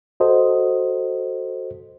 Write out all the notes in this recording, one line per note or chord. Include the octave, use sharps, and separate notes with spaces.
F#4 A4 C5 D#5